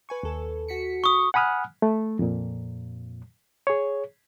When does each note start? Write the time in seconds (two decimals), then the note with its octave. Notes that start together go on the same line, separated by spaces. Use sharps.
0.09 B4 G#5 C#6
0.23 D#2 A4
0.68 F#4 B6 C#7
1.04 C#6 D#6
1.34 F#5 G#5 B5 D#6 F6 F#6
1.82 A3
2.19 F2 A#2
3.67 G#4 C#5